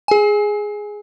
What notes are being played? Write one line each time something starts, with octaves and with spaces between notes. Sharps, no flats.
G#4 G#5